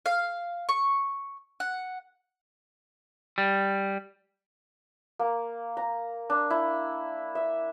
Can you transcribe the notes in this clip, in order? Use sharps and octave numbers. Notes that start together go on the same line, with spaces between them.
F5
C#6
F#5
G3
A#3
A#5
D4
E4
E5